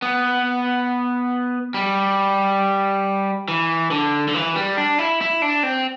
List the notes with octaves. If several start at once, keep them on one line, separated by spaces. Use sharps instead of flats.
B3
G3
E3
D3
D3
E3
G3
D4
E4
E4
D4
C4